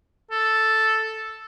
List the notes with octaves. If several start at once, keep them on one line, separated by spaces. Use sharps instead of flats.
A4